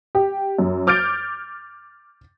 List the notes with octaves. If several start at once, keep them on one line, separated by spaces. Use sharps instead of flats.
G4
F#2
D6 F6 G6 A6 D7